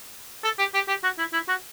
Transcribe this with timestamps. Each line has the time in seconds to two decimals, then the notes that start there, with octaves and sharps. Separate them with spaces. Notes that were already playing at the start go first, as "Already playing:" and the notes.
0.44 A4
0.59 G4
0.74 G4
0.88 G4
1.03 F#4
1.18 E4
1.33 E4
1.49 F#4